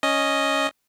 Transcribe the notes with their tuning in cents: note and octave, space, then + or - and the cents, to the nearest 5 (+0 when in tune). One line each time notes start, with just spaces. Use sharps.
C#4 +0 D#5 +0